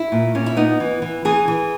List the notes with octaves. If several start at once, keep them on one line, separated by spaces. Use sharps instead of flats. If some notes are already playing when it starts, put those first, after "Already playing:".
Already playing: E4
A#2
A#2 C#4
E4
B3 D#4
E3
E3
E3 G#4
E3